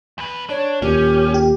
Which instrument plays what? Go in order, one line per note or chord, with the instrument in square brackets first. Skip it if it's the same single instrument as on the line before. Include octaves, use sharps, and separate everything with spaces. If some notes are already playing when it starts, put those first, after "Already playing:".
[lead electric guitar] E2 B4
[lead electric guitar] D4 [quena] C#5
[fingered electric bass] D#2 A#2 [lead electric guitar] C#4 [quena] G4
[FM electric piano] G4